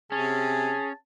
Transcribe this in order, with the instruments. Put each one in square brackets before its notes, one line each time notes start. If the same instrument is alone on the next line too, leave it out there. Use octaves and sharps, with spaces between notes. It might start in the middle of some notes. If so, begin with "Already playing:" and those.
[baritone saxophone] C3 [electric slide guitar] C#4 [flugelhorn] G#4 [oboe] A5